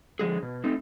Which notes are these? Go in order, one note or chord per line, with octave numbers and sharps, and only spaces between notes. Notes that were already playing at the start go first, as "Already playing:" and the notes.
D3 F3 G#3 G#4
B2
A3 C4 D#4